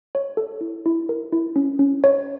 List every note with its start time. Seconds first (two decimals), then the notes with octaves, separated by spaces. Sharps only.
0.15 C#5
0.37 A4
0.61 E4
0.86 E4
1.09 A#4
1.32 E4
1.56 C#4
1.79 C#4
2.04 C#5